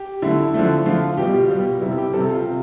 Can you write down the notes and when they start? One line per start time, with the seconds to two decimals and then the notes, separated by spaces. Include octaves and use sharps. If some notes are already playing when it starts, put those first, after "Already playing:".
Already playing: G4
0.22 D3 A3 E4
0.54 D3 F3 A3
0.86 D3 F3 A3 F4
1.17 B2 G3 G4
1.33 F4
1.50 B2 G3
1.81 C3 G3 E4
1.98 G4
2.13 C3 G3 A4
2.30 F4
2.45 C3